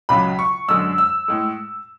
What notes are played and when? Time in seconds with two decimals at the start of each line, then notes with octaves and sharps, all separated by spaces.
0.09 C#2 C#3 F#3 B5
0.39 C#6
0.68 F#2 D3 G#3 E6
0.98 E6
1.28 A2 G#3